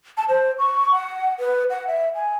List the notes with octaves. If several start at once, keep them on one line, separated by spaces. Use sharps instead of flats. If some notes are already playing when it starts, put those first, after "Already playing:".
A5
C5
C#6
F#5
B4
F#5
E5
G#5